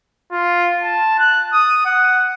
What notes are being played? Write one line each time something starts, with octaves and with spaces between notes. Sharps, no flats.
F4
A5
F#6
D#6
F#5